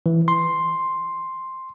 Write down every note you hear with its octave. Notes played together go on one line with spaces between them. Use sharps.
E3
C6